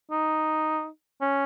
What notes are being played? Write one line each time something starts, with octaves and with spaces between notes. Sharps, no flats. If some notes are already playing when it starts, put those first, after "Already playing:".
D#4
C#4